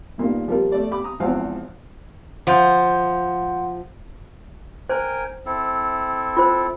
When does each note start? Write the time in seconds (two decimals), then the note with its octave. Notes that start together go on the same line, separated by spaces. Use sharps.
0.18 G2 A#2 D#3 A#3 B3
0.48 F3 G3 A#3 F4 G4 A#4
0.72 A3 D5
0.91 G4 B5 D6
1.04 A#5 D#6
1.20 G#1 E2 E3 F3 C4 F5
2.47 F3 F#5 C6 G6
4.89 A#4 C5 G5 G#5
5.46 C4 E4 A4
6.37 F4 C5